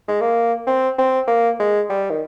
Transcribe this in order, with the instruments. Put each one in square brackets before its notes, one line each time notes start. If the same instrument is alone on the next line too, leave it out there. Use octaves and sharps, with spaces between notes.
[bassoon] G#3
A#3
C4
C4
A#3
G#3
G3
D#3